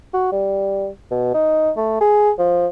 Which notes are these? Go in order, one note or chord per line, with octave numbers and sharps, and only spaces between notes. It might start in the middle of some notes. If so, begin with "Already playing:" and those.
F#4
G3
B2
D#4
A3
G#4
F3